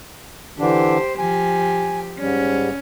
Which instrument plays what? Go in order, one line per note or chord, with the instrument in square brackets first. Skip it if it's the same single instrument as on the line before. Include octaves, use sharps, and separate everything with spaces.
[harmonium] D3 E3 D4 [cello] G4 C5
[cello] F3 G4 [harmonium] G#5
[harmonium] G#2 G3 [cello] C#4